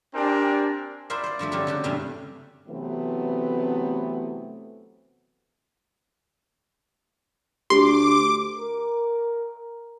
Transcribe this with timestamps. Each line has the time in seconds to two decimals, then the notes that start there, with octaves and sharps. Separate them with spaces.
0.14 C4 D4 G4 A#4 G#5
1.10 E4 F4 A#4 C5 D5 E5
1.24 C5 D5
1.39 G2 F3 A3 A4
1.52 D3 F#3 C#4 G4 A4
1.67 C#3 F#4 G4
1.84 E2 G2 C3 A3 C#4
2.68 C3 E3 F#3 A3 B3 C4
7.70 D2 G4 C6 D6
8.59 A#4